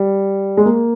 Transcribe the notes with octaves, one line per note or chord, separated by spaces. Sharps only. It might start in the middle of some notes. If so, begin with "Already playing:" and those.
Already playing: G3
G#3
A#3